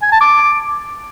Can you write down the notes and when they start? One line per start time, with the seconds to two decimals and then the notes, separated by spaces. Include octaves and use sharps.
0.02 G#5
0.12 A5
0.21 D6